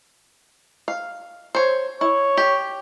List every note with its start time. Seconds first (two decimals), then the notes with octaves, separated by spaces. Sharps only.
0.88 F5
1.55 C5 C#5
2.01 E4 C#5
2.37 G4